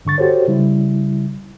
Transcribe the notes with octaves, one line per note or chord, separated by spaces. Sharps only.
G2 D3 C#6 A6
F#4 G4 A4 C5 C#5
C#3 G3 E4